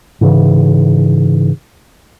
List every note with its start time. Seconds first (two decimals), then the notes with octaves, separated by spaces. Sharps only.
0.21 G#2 C#3 E3